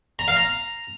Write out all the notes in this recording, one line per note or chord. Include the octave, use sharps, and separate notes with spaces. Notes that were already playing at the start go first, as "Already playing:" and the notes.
A#5
F5
A#5